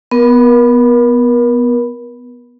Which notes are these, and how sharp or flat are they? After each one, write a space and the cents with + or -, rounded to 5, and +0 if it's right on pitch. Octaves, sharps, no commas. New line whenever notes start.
B3 +0 A#4 +35